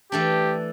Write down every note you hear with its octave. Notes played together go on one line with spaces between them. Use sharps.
E3 A3 D4 G4